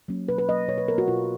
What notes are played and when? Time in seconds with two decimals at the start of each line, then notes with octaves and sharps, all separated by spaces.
0.08 F#3 A#3 C#4
0.28 B2 B4
0.38 B4
0.48 F#3 A#3 C#4 D#5
0.68 B2 C#5
0.78 B4
0.88 F#3 B3 A#4
0.98 F#4
1.08 B2 F4